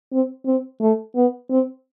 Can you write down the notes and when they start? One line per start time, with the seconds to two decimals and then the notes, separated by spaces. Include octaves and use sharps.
0.13 C4
0.46 C4
0.81 A3
1.15 B3
1.50 C4